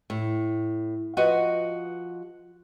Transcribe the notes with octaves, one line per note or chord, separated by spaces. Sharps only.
A2
F3 F#4 B4 D#5 F#5